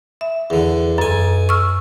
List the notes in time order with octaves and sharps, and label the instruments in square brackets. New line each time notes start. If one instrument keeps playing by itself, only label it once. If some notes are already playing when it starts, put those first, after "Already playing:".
[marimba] E5
[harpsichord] E2 D3
[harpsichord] B1 G#5 [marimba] F#2
[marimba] C#6 E6 F6